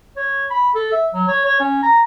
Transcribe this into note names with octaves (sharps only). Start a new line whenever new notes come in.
C#5
B5
A4
E5
F#3
C#5
C#5
C#4
A#5